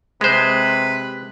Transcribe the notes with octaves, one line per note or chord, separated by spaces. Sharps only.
C3 G#3 B4 C5